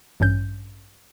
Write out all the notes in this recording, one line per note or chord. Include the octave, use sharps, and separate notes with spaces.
A1 G2 C#4 G6